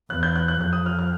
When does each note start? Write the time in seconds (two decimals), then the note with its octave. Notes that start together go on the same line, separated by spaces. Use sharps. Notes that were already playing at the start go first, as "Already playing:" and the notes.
0.10 E2 F#6
0.23 G6
0.36 F#6
0.48 F#6
0.61 F2 F#6
0.73 D#6
0.86 F6
0.99 F6